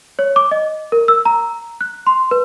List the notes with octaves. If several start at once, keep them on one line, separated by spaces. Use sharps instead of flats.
C#5
D6
D#5
A#4
E6
A#5
F#6
C6
B4